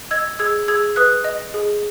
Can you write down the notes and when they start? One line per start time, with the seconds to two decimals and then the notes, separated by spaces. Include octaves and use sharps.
0.11 D#5 E6 G#6
0.39 G#4 E6 G#6
0.68 G#4 E6 G#6
0.96 B4 D#6 F#6
1.24 D#5
1.54 G#4